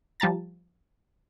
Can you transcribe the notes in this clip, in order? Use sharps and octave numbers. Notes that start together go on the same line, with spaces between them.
F3 G3 A5 A#5 A6